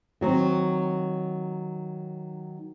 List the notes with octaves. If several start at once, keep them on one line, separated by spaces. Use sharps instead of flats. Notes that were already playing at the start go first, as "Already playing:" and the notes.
D#3 F#3 C4